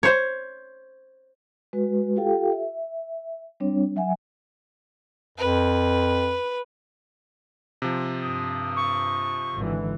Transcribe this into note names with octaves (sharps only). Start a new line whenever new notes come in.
C5 C#5
G#3 F#4 B4
F4 G4 A4 F5 G5
E5
G3 C4 D4 C#5
F#3 E5 F#5 G#5
F2 B4
C3 F3
G2 D#6
C#6
G#1 D3 E3